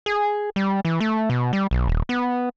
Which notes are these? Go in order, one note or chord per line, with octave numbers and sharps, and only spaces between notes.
G#4
G3
E3
A3
B2
G3
B1
D#1
B3